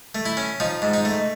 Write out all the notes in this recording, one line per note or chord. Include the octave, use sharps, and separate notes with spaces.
A3
E4
C#4
F3 D#4
G#2
D#4
A3